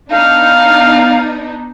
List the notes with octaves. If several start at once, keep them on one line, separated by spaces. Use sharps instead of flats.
B3 D4 D#4 F5